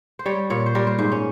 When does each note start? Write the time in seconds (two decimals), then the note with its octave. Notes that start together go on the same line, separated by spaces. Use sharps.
0.19 C5
0.26 G3 C#5
0.50 A#2 C#5
0.66 C5
0.75 G3 A#4
0.87 C5
0.98 G#2 C5
1.12 C#4